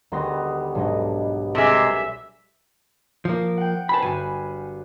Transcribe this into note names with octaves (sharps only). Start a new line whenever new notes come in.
D2 D#3 G3 B3 C6 A#6
B1 G#2 D3 D#5
C3 G#3 E5 G#5 D6 A6
F3 A#3
F#5 G5
B4 C5 G#5 A5 B5
G1 F#4 G#5